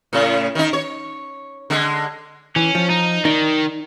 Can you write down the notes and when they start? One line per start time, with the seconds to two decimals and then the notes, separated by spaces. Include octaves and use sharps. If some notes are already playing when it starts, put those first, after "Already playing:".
0.13 A2 C#3
0.55 D#3 D#4
0.73 C#5
1.70 D3 G#3
2.56 E3 C#4
2.75 F3
2.90 D#4
3.25 D#3 D#4 D5